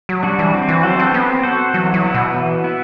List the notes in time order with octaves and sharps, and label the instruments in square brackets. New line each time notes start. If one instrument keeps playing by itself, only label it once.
[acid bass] F#3
[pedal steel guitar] G3 D4 F#4
[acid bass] E3
[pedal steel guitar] C4
[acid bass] E3
[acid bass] F#3 [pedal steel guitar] F#4 A4 C5
[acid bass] D4
C4
[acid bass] B3 [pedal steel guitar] C4
[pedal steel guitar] F#4 A4 C5
[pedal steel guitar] E3 [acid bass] F#3
[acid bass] F#3
[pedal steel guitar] B3 E4
[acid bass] B2
[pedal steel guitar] E3
B3 E4